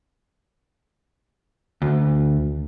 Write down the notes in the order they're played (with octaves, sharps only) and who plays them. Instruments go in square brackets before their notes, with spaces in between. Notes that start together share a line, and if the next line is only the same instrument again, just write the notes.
[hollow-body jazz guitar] D2